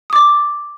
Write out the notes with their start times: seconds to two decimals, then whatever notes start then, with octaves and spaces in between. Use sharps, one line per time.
0.10 D#6
0.13 D6
0.16 A6